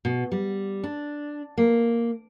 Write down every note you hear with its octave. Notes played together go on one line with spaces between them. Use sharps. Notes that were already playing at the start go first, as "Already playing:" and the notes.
B2
G3
D4
A#3